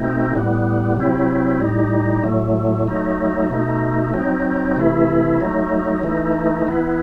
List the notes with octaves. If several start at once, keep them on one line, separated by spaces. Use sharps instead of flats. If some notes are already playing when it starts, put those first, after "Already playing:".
Already playing: B2 A3 C4 D#4
A2 G3 B3
C3 F#3 C4 E4
A2 G3 D#4
A2 F#3 A3
F#3 A3 D#4
B2 A3 D#4
F#3 C4 D#4
C3 E3 A3 E4
F#3 A3 D#4
E3 A3 D#4
E3 B3 E4